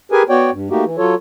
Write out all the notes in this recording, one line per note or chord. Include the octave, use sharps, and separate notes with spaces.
G4 G#4 A#4 B4 G#5
B3 F#4 C#5 D5 G5
G2
A3 A#3 D#4 F#4 G4
E3
F#3 F4 A4 C#5